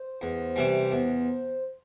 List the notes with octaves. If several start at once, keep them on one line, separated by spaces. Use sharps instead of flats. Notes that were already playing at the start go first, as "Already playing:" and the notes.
Already playing: C5
E2
C3 E3 G3
E2